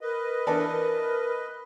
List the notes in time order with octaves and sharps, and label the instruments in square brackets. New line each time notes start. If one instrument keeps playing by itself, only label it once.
[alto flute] A#4 [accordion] B4 D#5
[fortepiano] E3 D4 A4
[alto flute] A#4